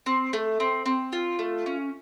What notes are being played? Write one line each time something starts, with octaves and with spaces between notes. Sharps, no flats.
C4
A3
C4
C4
F4
A3
C#4